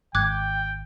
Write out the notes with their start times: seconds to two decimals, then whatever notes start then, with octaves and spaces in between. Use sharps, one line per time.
0.15 G#1 G5 D6 F#6 G#6